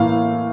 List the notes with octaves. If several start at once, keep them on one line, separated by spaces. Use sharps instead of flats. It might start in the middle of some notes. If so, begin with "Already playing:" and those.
Already playing: A2 E3 A#3 F5